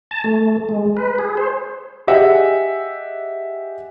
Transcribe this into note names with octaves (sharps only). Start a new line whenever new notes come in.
A5
A3
G#3
B4
G#4
C5
G4 G#4 D#5 E5 F#5